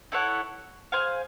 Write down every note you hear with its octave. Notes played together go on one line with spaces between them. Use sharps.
E4 A4 C#5 F#5
G#4 C5 F5 G#5